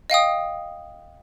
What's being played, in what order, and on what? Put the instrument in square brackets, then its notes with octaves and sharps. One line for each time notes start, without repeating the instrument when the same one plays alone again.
[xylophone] D#5 F5 G5 D#6